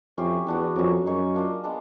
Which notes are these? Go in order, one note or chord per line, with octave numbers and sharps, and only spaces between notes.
F2 C#4 E4 G4 C5
E2 B3 D4 F#4
F2 F#3 A#3 C#4
F#2 D#4 G#4 C#5
A#3 D4 F4
G#3 B3 D4